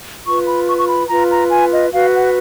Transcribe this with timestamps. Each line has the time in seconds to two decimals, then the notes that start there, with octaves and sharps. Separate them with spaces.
0.25 F4 B4 C#6
0.46 B5
0.67 C#6
0.78 C#6
0.87 B5
1.09 F4 B4 A#5
1.30 A#5
1.50 G#5
1.71 D#5
1.93 F#4 B4 F5
2.14 F#5